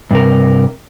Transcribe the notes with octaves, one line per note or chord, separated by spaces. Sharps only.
G2 C3 A#4